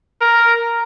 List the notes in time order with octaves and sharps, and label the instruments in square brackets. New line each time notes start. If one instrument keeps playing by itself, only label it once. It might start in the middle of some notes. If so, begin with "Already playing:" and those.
[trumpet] A#4